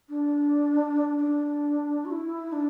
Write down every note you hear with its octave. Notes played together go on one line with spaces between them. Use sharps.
D4
D4
F#4
E4
E4
D4